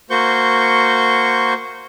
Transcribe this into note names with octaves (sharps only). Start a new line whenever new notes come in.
A#3 F#4 C5 C#6 G6